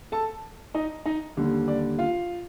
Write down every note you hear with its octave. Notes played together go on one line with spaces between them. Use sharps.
A4 A5
D#4 D#5
D#4 D#5
D#2 D3 G3
D5
F4 F5